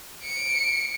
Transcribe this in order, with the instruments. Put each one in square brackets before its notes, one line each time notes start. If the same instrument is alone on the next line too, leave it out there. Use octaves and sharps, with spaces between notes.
[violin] C#7 D7